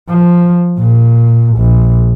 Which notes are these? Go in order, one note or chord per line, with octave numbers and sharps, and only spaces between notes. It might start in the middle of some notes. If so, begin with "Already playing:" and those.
F3
A#2
A#1